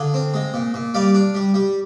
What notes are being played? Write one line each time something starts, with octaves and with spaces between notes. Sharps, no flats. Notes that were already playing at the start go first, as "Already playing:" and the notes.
Already playing: D3 F4 G#4
C4
G#3
A#2
A#2
G3 D5 F5
D4
G3
G3